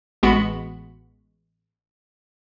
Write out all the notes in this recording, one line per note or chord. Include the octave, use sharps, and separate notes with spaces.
A1 G#3 B3 F#4 B5 C#7